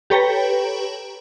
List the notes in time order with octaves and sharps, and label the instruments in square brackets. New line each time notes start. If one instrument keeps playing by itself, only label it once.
[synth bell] G4 A4 B4 C#5 G5 A#5